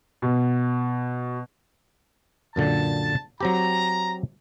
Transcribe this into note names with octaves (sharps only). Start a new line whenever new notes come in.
B2
F#2 A#2 D3 A5
F#3 C4 G4 A#5